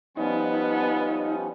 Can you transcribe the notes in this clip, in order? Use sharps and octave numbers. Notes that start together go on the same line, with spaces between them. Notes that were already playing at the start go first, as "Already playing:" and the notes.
F3 G3 B3 C#4 D#4